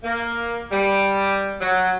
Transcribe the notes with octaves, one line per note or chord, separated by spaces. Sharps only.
A#3
G3
F#3